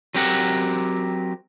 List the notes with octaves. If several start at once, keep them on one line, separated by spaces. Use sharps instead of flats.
F#3 C4 G4 A#4 F#5